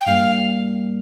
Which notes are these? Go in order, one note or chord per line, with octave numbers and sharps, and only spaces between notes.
G5
G2 G3 A#3 F5